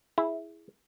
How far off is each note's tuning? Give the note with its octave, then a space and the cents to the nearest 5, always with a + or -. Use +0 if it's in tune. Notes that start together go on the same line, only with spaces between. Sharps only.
E4 +0 G#4 +0